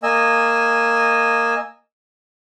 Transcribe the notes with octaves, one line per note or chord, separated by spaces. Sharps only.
A#3 D#5 G#5 E6